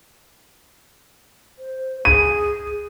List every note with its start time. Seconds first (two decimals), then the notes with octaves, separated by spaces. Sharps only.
1.59 C5
2.05 G#4 D#7